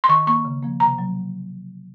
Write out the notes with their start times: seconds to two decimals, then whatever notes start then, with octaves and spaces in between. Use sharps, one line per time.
0.04 C6
0.09 D#3 C#6
0.27 A#3 C#6
0.45 C#3
0.63 F3 A#3
0.80 C3 A#5
0.98 F#3